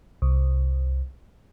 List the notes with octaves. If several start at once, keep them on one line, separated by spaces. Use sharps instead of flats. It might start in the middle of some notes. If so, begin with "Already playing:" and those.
C2